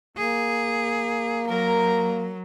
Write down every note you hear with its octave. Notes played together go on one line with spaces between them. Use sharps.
A#3 G#4
F#3 A#4 A#5